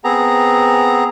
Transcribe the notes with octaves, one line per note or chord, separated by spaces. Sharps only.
B3 C4 G#4 A#5